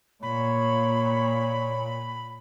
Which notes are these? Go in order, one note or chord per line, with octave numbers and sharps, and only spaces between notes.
A#2 C#5 B5